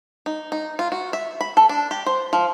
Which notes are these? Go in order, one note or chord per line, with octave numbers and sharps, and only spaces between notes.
D#4
D#4
F4
F#4
E5
B5
A4
D4
G4
C5
F3